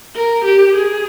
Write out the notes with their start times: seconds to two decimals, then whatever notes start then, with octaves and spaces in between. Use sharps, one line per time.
0.15 A#4
0.45 G4
0.75 G#4